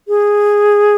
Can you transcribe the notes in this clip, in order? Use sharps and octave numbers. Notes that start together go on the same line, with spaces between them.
G#4